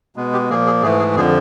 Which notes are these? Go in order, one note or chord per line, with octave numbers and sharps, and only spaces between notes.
B2 G#3 B3
G4
A#2 F3 A#3 G#4
G#4
G#2 E3 A3 G#4
G#4
F2 D3 F3 G#4